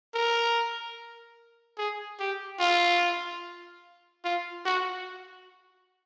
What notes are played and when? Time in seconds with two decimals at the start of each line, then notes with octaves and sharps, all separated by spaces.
0.15 A#4
1.78 G#4
2.20 G4
2.60 F4
4.25 F4
4.65 F#4